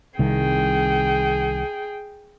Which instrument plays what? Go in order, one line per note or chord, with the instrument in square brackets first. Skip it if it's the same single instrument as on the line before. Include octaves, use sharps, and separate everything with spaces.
[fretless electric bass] C2 D#3 [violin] G#4 G5